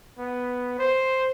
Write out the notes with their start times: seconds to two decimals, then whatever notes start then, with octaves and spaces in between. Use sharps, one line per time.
0.18 B3
0.79 C5